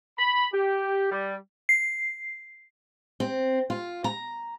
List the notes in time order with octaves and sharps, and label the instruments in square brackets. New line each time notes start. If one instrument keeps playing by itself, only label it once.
[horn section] B5
G4
G3
[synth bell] C7
[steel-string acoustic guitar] C4
F4
A#5